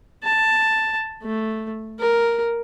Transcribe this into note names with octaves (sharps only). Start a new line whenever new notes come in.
A5
A3
A#4